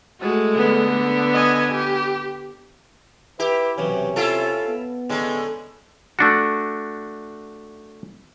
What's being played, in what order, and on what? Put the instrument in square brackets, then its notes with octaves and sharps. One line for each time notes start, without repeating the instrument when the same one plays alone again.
[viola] G#3 A3 [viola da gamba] F#4
[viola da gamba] D3 B3 D4
[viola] D#5 G#5
G4
[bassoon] E4 [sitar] G4 [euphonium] B4
[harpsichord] B1 E3 F#3 [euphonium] C3 [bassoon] C#4
[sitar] E4 F4 A4 [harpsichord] A#4 E5
[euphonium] B3
[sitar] A2 [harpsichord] D3 C#4 G#4 [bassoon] G#3
[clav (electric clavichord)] A3 D4 F#4